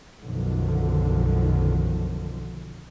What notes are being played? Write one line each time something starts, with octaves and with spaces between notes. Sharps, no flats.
B1 F#2 D3 D#3 F3